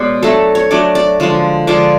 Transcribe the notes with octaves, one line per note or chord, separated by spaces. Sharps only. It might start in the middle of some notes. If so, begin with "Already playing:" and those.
Already playing: B2 G#3 C#4 D5
F#3 A3 D4 A4
C#5
F#3 A3 D4 D5
D5
D3 F3 G#3 D4
D3 F3 G#3 D4 D5